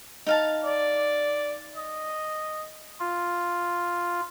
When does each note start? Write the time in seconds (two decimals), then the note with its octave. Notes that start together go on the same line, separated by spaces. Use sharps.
0.27 D#4 F5 A5
0.64 D5
1.76 D#5
3.00 F4